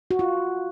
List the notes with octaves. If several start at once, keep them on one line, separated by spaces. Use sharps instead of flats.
F#4
F4